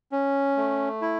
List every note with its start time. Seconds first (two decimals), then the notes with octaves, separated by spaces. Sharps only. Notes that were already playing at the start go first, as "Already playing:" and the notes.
0.12 C#4
0.57 A3
1.02 E4